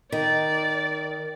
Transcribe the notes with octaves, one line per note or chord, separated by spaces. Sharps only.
D#3 D5